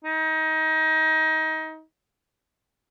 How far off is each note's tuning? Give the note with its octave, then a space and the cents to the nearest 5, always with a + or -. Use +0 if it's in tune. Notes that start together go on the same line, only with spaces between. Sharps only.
D#4 +25